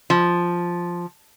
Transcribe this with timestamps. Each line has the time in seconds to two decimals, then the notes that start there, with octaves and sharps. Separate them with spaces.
0.10 F3